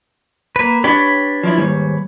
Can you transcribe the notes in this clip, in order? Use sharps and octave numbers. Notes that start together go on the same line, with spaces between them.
A#3 B4
D4 G4 B4 C#5 B5
F3 D4 E4
D#2 G#2 G3